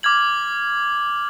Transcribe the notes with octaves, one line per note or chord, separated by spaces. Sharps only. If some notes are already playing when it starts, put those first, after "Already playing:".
D6 F6 G#6 F#7